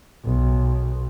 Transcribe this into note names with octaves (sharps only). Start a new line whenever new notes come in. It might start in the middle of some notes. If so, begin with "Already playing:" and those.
B1